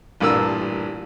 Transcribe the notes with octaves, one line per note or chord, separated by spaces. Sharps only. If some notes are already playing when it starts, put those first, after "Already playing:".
A1 G2 A#2 A#3 E6